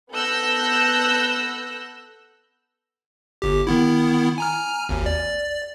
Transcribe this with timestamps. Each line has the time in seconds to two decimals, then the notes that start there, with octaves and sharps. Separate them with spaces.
0.11 B3 A4 E6 F#6 G6 A#6
3.42 G1 G4
3.67 D#3 B3 E4
4.38 G#5 A#5 F6
4.89 G#1 D#2
5.06 D5